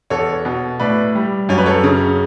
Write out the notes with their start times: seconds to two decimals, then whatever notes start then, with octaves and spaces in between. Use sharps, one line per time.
0.10 E2 A4 C#5
0.45 B2
0.80 A2 B4 D5
1.15 G3
1.49 F#2 C#5
1.58 B4
1.66 A4 C#5
1.84 C#3